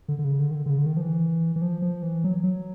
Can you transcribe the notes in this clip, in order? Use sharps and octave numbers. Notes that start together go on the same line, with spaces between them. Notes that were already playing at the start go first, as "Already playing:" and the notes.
D3
D3
C#3
D3
D#3
D3
D3
C#3
D3
D#3
F3
E3
E3
F3
F3
E3
F#3
F#3